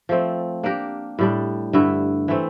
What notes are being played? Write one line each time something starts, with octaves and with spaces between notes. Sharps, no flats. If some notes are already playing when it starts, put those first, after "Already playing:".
F3 A3 C4
A#3 D4 G4 A#4
A2 G3 D4
G2 D3 A3 E4
E3 A3 C4